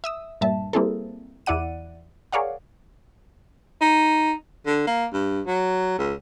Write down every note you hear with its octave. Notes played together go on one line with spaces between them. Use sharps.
E5 D#6 E6
G2 A#2 E5 A5
G3 A#3 C4 E4 G#4 A4
E2 E4 D5 F#5 D#7
G#4 A#4 C#5 D5 F5 F#5
D#4
D3
A#3
G2
F#3
C#2